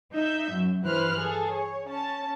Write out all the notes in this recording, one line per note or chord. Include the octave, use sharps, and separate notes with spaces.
D#4 E5 G6
F#2
G2 E3 B4 C5 F6 F#6
G#4 A4
C#5
C#4 A5